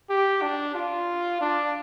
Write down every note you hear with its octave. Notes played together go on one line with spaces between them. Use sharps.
G4
D4
F4
D4